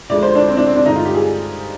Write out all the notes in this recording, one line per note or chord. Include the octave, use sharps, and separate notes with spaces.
D2 D3 F3 G#3 D5
C5
D4
C4
D4
C4
D4
G2 D3 G#3 D#4
F4
G4
G#4